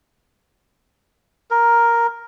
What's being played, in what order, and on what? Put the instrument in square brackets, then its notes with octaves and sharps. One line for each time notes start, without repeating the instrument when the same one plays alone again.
[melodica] A#4